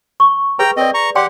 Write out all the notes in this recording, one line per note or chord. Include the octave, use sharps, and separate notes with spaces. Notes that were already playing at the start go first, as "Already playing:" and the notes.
C#6
G#4 B4 G5 A#5
C4 A4 D5 D#5
A#5 C#6
G4 D5 F#5 G5 C6